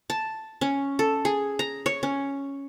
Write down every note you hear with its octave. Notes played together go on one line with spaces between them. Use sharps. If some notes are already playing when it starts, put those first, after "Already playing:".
A5
C#4
A4
G#4
A#5
C#5
C#4